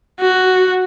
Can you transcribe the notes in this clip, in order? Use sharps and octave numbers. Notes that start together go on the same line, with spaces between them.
F#4